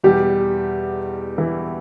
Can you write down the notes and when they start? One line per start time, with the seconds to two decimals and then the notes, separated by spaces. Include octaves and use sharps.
0.04 E2 B2 G3 G4
1.38 E3 E4